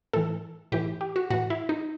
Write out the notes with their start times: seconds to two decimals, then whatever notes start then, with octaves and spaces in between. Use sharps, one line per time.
0.13 A2 E3 A4
0.72 A2 E3 G4
1.01 G4
1.16 F#4
1.30 A2 E3 F#4
1.50 E4
1.69 D#4